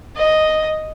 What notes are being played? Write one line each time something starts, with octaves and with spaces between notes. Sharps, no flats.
D#5